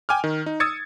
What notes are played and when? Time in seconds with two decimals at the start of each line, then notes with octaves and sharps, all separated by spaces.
0.09 G5 G#5 D6 F6
0.24 D#3
0.46 D#4
0.60 D#6 E6 G#6 A6 C#7